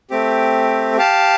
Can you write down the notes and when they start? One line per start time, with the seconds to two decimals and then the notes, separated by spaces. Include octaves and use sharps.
0.10 A3 C4 G4
0.97 G4 F5 A5